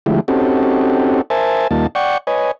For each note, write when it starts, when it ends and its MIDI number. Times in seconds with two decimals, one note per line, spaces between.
0.06 0.20 50
0.06 0.20 53
0.06 0.20 56
0.06 0.20 57
0.06 0.20 64
0.06 0.20 67
0.28 1.21 60
0.28 1.21 61
0.28 1.21 63
0.28 1.21 66
0.28 1.21 67
0.28 1.21 69
1.30 1.68 70
1.30 1.68 72
1.30 1.68 76
1.30 1.68 80
1.30 1.68 81
1.71 1.87 39
1.71 1.87 55
1.71 1.87 58
1.71 1.87 63
1.71 1.87 65
1.71 1.87 81
1.95 2.18 74
1.95 2.18 78
1.95 2.18 79
1.95 2.18 85
2.27 2.51 71
2.27 2.51 73
2.27 2.51 75
2.27 2.51 80